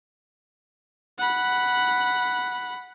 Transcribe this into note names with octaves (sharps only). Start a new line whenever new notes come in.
F#5 B5